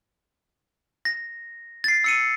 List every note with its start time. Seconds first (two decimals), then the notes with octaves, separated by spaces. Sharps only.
1.05 A#6
1.84 A6 C7
2.04 E6 C#7 D#7